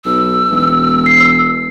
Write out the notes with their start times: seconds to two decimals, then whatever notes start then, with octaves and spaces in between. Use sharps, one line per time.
0.05 B1 E6
0.51 E1
1.06 C7